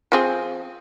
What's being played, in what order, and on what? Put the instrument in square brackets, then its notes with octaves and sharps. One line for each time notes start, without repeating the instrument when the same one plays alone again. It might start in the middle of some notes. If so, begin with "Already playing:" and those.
[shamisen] F3 C4 G#4